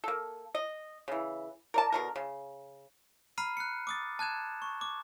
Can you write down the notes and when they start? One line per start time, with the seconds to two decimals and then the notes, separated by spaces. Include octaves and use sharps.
0.04 A#3 A4
0.55 D#5
1.08 C#3 E3
1.74 A#4 D5 A5
1.92 B2 D3 A#4
2.16 C#3
3.38 A#5 B5 F6 C7 D#7
3.57 F#6 C#7
3.87 D6 D#6 A6
4.19 A5 F#6 G#6 E7
4.62 C#6
4.81 D6